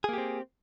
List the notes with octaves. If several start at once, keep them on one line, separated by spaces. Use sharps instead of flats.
A#3 C4 G4 G#4